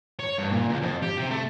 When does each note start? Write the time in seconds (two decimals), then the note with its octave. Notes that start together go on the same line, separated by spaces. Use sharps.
0.19 C#5
0.38 G2
0.52 A#2
0.69 C#2
0.82 F2
1.02 G4
1.18 C3
1.31 A3